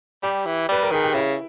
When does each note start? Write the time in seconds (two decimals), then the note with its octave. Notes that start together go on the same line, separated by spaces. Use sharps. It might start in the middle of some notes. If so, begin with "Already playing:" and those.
0.23 G3 G4
0.46 E3
0.69 G3 B4
0.83 A#4
0.92 D#3 G#4
1.04 G4
1.15 C#3 E4